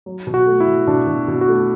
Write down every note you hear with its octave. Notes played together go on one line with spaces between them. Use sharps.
F#3
B2
F#4
A3
E4
B2
B2 D4
B2
B2
F#4
A3